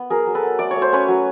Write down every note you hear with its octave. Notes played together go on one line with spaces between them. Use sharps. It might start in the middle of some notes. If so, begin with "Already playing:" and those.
Already playing: B3
F#3 G#4 A#4
F#3
A4 B4
B3
A3 D5
C#5
A3
C5
C#4 B4 C#5
F#3